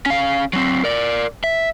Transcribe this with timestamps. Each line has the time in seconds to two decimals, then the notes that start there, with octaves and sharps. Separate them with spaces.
0.06 C#4 F5
0.53 F#3 C4
0.84 A#4 D5
1.44 E5